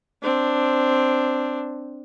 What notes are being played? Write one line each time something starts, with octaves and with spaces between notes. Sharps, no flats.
C4 D4